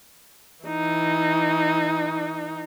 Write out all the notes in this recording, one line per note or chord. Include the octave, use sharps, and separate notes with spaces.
E3 D#4